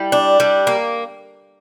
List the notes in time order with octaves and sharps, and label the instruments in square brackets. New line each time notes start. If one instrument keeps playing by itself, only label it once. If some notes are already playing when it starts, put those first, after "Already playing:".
Already playing: [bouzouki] G3 [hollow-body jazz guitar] E4
[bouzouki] D4
G3
A#3